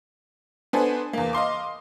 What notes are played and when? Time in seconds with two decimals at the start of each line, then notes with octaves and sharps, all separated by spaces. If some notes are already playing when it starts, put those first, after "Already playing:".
0.73 B3 D4 A4 C5 G#5
1.13 E2 A#3
1.33 D#5 F5 C6 D6